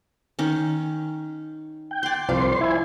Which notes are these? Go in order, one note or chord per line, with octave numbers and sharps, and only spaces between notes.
D#3 C#4
G5
D5 C6
C2 F3 F4 C5 D5 C6
E4 G#5